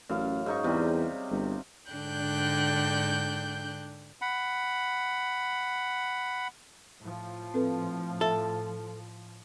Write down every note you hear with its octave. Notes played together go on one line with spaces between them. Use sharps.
A1 F#2 F5
G#2 D#4 C#6
E2 C3 G3
G1
G#2 D3 D4 G5 F#6 G6
F#5 B5
A2 F3
C4 A4 B4
A4 E5